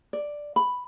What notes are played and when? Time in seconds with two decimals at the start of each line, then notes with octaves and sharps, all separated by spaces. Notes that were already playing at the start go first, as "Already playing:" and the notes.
0.13 D5
0.56 B5